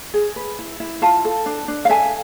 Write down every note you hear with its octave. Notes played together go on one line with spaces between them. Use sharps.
G#4
B4
E4
E4
F4 F5 A5
A4
D4
D4
F5
A4 E5 G#5